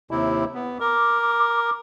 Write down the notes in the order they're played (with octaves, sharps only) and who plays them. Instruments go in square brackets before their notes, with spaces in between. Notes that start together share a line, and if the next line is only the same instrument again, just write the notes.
[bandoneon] D#2 C3 E4
B3
[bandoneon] A#4 [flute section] D6